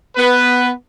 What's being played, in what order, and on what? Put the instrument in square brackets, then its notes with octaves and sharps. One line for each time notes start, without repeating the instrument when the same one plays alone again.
[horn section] B3 B4